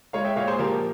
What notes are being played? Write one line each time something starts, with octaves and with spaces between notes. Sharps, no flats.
G#3 C#5 F5
E5 G5
A#2 C#5 F5
G#4 C5
F3 G4 A#4